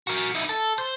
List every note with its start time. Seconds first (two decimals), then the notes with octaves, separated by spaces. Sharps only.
0.07 F#4 A#4
0.35 D#4 E4
0.49 A4
0.78 C5